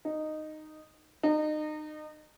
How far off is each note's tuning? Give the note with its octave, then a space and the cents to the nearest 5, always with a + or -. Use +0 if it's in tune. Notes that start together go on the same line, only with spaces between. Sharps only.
D#4 -10
D#4 -30